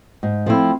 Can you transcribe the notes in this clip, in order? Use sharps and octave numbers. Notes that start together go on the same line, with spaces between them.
G#2
F3 A3 C4 E4